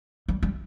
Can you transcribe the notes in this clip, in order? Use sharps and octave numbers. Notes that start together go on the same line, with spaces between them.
G3
G3